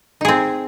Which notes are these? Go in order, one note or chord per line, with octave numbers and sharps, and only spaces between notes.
C4 D#4 G#4